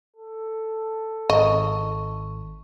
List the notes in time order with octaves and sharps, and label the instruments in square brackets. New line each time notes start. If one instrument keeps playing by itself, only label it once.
[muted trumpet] A4
[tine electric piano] G#1 [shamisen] D#5 [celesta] C#6